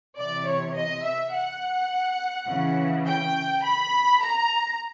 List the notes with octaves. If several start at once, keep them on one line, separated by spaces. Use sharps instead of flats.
C3 E3 D5
C#5
D#5
E5
F#5
C#3 E3
G5
B5
A#5